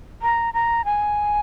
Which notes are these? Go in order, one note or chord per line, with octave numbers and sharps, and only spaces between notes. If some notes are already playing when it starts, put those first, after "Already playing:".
A#5
A#5
G#5